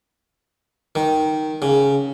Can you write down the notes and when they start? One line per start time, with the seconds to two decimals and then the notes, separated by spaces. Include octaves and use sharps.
0.95 D#3
1.62 C#3